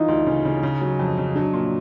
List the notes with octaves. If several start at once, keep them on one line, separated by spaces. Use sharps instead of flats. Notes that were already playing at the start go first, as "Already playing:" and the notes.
Already playing: E3 D#4 F4
D2
C#3
C#3
C#3
F#3
F2
C#3
F#3 D4
A#2